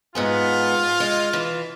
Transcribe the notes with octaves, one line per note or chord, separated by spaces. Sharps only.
G#2 B3 F4 G#4
G#3
E3